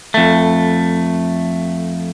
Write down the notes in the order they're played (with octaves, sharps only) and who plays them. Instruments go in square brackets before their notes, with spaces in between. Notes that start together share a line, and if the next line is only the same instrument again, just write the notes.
[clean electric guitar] F2 A3